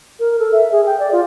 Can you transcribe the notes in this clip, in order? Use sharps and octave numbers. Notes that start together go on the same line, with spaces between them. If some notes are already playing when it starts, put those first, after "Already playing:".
A#4
A4
E5
G#4
G5
D5
F4